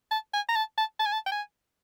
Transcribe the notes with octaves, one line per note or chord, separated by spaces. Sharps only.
A5
G#5
A#5
A5
A5
A5
G#5
A5
G5
G#5